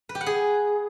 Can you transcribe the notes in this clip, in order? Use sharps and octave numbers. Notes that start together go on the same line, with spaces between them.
B4
G4
F#5
G#4